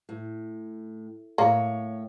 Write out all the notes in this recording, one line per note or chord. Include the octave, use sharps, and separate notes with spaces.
A2
A2 A#3 C#5